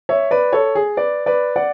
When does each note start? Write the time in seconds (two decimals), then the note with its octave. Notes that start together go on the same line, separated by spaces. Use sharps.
0.09 C#5 E5
0.31 B4 D5
0.53 A4 C#5
0.75 G#4
0.97 B4 D5
1.26 B4 D5
1.56 D5 F#5